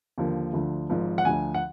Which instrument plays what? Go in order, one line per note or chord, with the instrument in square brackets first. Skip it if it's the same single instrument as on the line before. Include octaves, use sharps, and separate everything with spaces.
[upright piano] D#2 D3 F3
D2 D3 F3
G#1 G#2 F3
F#5
D2 D3 F3 G#5
F#5